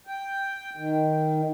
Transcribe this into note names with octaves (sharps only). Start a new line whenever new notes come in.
G5
D#3